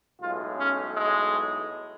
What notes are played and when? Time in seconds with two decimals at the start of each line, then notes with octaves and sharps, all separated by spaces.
0.21 B1 A2 G#3 F4
0.59 C#4
0.96 G#3